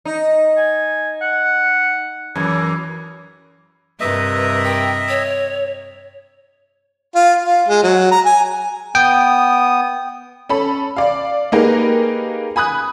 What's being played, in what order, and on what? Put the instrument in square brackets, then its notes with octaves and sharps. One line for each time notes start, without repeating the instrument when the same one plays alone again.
[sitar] D#4
[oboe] G#5
F#5
[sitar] F#2 E3 [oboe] G#4
[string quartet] G2 C3 A#4 [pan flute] B4 [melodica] D#5 E5
[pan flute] G5
C#5
[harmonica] F4
F4
G#3
F#3
A#5
G#5
[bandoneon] B3 D#6 [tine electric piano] G5
[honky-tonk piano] C#4 A4 B5
D5 F5
A#3 D#4 G4 G#4 A#4 B4
G#5 B5 D#6 F#6